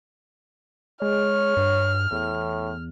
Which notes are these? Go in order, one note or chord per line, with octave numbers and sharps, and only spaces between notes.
G#3 C#5 F6
G2
E2 A2